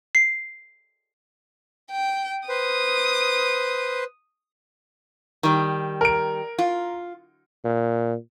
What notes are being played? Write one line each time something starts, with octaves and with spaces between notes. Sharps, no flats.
C7
G5
B4 C5 D#6
D#3 G3
A#4 D7
F4
A#2